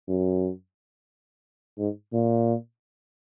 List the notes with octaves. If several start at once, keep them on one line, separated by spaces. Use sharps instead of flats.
F#2
G#2
A#2